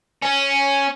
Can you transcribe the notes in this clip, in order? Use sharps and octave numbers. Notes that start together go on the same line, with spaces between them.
C#4